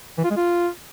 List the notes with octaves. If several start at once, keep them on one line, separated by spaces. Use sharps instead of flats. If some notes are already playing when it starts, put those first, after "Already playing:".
E3
F4
G#3
F4